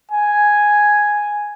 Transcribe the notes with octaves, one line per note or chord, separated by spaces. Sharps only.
G#5